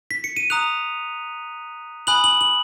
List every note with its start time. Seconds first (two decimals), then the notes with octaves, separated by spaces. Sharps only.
0.11 B6
0.24 C#7
0.37 D#7
0.50 A#5 D#6 F#6 F7
2.07 G#5 B5 D#6 F#6 F#7
2.24 F#7
2.41 F#7